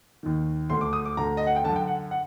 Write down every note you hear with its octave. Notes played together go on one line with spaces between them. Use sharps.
D#2 D#3
D2 D3 C6
D6
D#6
D6
D2 D3 A#5
D#5
F#5
G5
F#2 D3 A5
G5
F#5
F#5